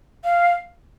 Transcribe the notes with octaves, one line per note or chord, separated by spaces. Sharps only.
F5